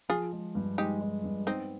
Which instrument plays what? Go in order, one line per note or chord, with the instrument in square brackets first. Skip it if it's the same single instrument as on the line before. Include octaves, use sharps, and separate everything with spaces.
[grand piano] F3 [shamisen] F4 G#4
[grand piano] G#3
G2
[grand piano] G#3 [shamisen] D#4 G4
[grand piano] G#3
G2
[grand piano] B3 [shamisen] C4 D#4